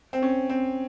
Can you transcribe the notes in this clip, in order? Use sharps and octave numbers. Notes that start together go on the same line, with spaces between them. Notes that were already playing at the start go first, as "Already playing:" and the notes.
C4
C#4
C4